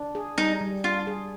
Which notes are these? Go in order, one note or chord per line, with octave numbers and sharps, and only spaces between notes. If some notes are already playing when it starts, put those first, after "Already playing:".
Already playing: D4
G#4
G3 D#4
G3
D4 F4
G#4